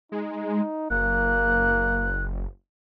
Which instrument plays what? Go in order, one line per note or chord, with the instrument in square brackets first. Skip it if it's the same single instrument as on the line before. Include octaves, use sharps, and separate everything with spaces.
[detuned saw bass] G#3 [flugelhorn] D#4
[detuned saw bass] F#1 [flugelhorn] A#3 [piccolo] F#6